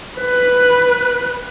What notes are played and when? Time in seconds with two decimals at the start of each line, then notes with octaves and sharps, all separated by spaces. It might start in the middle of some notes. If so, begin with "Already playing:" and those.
0.18 B4